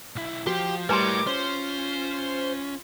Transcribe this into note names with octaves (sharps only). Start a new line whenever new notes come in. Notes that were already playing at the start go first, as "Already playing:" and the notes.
B1 E4
F3 F#4 G4
A2 G3 A#4 B4 A#5 C6 D6
C#4 F4 C5